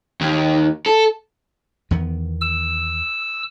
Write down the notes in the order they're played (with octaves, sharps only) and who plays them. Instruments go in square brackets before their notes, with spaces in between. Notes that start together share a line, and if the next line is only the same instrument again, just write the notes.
[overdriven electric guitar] D#2
A4
[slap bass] E2 D#3 B3
[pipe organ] E6